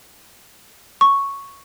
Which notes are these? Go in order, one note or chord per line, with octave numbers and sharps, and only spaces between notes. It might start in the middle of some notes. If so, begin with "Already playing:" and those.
C#6